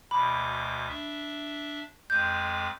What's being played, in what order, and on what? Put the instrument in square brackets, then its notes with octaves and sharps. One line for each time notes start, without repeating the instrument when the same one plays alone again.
[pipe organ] D2 B2 D6 [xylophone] B5
[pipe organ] D4 E5
[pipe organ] F2 G#3 D6 [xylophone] G6